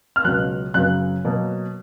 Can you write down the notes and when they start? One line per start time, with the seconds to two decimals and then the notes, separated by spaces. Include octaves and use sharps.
0.16 F6
0.25 C#2 B2 F#3 F#6
0.74 F#2 C#3 F#3 B3 F#6
1.24 B2 F#3 A#3